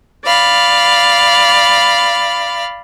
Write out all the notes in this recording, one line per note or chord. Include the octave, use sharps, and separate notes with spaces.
D5 F5 B5